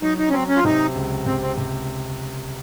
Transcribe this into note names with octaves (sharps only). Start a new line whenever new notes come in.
F#3 D#4
D#4
C#4
F#3 C4
C#4
F4
C3 D#4
C#2
C3 C4
C4
C3